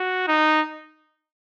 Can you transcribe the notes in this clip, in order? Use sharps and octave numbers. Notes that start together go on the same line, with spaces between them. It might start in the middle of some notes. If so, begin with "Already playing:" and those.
Already playing: F#4
D#4